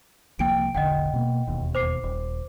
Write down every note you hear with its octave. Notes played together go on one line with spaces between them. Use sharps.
C2 F3 A#3 G5 D7
E1 A1 D3 D#5 F#5 G5
B2 A3 A#3
E1 D#2 B2
C5 D6 C7
D#1